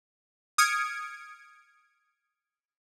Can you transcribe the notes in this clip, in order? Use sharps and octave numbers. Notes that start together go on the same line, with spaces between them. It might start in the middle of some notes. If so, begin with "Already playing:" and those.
D#6 F6 G#6 C#7 D7